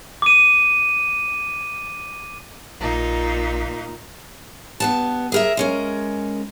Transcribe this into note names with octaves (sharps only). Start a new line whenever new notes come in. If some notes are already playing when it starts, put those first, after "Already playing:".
D6 D#7
A#1 A#2 D#4
G2 B3 A5
G#4 A#4 E5
G#3 C#4 A#4